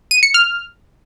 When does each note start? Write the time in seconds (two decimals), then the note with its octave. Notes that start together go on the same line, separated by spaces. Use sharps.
0.11 D#7
0.23 C#7
0.34 F6